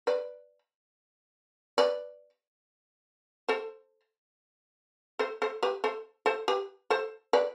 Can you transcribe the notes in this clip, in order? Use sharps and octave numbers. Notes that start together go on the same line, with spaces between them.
B4 D5
B4 D5
A4 C5
A4 C5
A4 C5
G4 B4
A4 C5
A4 C5
G4 B4
A4 C5
B4 D5